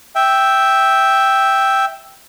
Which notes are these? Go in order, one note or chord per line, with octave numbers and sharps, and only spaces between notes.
E5 G5